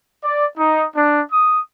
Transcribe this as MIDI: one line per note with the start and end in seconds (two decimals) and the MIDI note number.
0.22 0.44 74
0.57 0.85 63
0.95 1.19 62
1.30 1.58 87